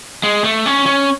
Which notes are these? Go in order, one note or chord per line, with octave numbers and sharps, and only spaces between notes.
G#3
A3
C#4
C#4